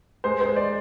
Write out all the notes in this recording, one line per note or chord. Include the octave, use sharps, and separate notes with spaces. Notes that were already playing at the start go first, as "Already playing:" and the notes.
G#3 C5
G#3 C5
D5